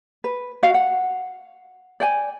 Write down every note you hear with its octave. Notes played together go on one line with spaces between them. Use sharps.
B4
F#4 F5
F#5
D5 G5 G#5